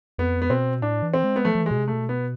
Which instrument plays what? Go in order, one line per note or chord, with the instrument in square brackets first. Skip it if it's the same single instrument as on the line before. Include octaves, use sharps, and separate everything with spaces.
[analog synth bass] F2 [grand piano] B3
[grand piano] B3
[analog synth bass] B2 [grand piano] C4
[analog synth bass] A2 [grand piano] D4
[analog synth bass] E3
[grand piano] C4
[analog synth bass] G#3
[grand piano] B3
[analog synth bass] F3 [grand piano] A3
[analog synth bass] F3
E3
[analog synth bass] B2 [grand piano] G#3
[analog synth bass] C3
[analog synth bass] B2 [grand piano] A3
[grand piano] B3